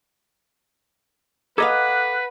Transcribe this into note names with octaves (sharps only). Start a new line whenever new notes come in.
A4 B4 D#5 F5 F#5 A#5 D6 G#6